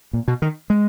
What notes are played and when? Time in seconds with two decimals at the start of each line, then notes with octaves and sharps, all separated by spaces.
0.13 A#2
0.28 B2
0.42 D#3
0.70 G#3